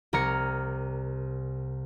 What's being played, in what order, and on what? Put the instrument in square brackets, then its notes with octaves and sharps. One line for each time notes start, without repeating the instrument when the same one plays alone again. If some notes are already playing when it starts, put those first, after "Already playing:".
[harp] C2 A#4 A#5 F6 G#6 C#7